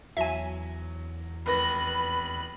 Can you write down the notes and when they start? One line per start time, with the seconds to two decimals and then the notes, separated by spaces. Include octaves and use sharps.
0.17 E2 F#3 E5 G#5
1.46 F1 B4 B5 A#6